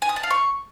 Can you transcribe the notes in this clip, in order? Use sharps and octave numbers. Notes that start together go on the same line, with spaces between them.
G#5
D#6
A5
F5
C#6